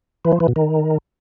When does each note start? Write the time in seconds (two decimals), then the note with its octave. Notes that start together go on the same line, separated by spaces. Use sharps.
0.25 E3
0.32 F3
0.40 E3
0.48 B2
0.56 D#3